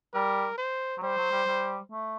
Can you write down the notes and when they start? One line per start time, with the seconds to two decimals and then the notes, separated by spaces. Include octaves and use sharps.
0.14 G3 A#4
0.58 C5
0.97 F#3
1.02 G3 C5
1.17 F#3
1.32 G3
1.47 G3
1.92 A3